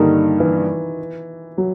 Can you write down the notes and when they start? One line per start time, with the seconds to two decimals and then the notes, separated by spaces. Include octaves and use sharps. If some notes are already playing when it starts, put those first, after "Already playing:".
Already playing: G2 D3 D#3 G3 A#3 D#4
0.40 E3
1.58 F#3